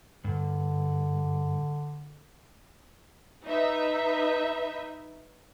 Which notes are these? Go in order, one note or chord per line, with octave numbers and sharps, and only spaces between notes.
G2 D3
D#4 B4 E5